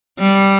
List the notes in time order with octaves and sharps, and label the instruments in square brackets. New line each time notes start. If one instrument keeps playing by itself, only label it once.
[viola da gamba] G3